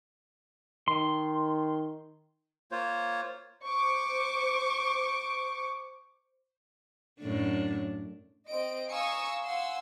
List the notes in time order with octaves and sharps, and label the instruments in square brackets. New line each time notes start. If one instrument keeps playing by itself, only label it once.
[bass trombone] D#3 [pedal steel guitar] C6
[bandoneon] A#3 F4 C5 C#5
[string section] C5 C#6 D6
[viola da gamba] F#2 A2 D4
[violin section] C4 D#5 D7
F5 G#5 A#5 C#6 D#6 E6
F5 F#5 G#5 C6 E6